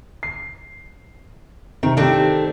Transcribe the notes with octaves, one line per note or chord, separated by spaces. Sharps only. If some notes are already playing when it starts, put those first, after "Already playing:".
C7
C3 D#3
D#3 A3 C4 D4 G4